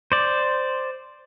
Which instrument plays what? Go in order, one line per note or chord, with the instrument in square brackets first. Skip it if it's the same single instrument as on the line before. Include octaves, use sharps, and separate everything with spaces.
[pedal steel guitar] C5 D5